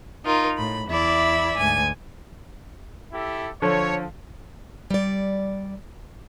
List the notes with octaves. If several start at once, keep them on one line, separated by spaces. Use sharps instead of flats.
D#4 F4 A#4
A2 B5
E2 E4 D5 E5 B5
D2 G#2 G#5
E4 G4 A4
D3 F3 A4 C#5
G3 D5